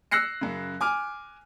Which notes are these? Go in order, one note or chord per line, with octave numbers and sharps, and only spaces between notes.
E6 F#6 A#6 C7 C#7
F#2 C#3
G#5 D6 F6